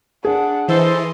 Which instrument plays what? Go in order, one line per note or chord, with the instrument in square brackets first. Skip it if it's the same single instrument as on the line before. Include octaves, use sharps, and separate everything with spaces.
[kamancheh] D4 F#5 [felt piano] G#4
[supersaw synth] E3 [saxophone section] A4 C5 [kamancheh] D#5 C6